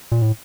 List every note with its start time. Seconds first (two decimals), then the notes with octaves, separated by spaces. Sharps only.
0.12 A#2
0.22 A2